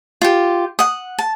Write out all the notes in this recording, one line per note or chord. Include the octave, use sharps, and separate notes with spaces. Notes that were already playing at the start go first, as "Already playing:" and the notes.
F4 G4
F#5 D#6
A5